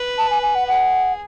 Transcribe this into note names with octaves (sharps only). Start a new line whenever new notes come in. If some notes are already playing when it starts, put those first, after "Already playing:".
Already playing: B4
A5
G#5
G#5
F#5
G#4 F#5